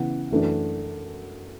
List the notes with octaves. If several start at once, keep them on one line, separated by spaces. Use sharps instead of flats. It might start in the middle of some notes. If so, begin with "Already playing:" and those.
Already playing: C#3 E3 B3 E4 F#5
F#2 E3 A3 D4